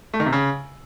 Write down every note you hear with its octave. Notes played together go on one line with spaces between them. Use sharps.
A3
D#3
C3
C#3